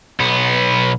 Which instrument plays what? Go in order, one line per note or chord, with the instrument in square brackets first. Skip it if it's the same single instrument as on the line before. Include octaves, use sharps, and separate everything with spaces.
[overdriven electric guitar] B1 B3